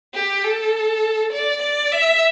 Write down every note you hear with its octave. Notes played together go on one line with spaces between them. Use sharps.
G4
A4
D5
D5
E5